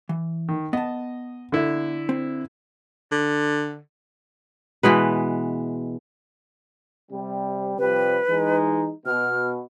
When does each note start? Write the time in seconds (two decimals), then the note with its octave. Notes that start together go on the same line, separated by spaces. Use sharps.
0.09 E3
0.49 D#3
0.73 B3 D#5 A5
1.52 D3 E4
2.09 C4
3.12 D3
4.83 B2 E3 G#3 B4
7.11 C3 G3
7.79 C3 F3 G3 B4
8.29 E3 G#3 D#4
9.06 B2 F6